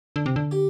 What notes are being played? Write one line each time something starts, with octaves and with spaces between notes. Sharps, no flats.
D3
C3
D3
G4